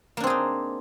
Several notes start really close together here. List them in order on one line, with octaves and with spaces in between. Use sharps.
A#3 D4 C4 G#4 D#4